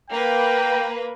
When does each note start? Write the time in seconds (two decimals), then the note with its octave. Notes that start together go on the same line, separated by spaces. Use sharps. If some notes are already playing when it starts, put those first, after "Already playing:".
0.10 A#3 B4 G5